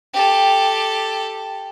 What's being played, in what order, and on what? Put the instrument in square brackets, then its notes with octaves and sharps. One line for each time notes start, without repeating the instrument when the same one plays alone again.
[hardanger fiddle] G4 A4